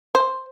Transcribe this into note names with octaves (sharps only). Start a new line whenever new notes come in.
C5